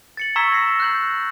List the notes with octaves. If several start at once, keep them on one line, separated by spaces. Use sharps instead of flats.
A6 C#7 F#7
A#5 C#6 E6 G#6 B6 E7
A#6 C7
F#6 G6 F#7
G6